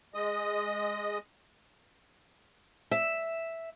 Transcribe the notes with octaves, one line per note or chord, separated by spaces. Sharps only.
G#3 D#5 D#6
E5